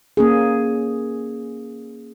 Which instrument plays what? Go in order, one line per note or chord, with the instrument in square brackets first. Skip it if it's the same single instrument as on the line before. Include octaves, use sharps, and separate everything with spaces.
[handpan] A#3 C#4 G#4